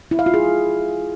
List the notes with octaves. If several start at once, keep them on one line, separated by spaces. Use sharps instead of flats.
E4
F5
F4
G#4